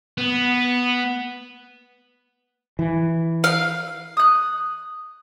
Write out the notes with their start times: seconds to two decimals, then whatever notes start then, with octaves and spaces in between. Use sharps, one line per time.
0.18 B3
2.79 E3
3.44 F5
4.17 D#6 F#6